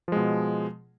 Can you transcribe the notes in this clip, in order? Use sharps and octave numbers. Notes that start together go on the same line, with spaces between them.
B2 F3 G#3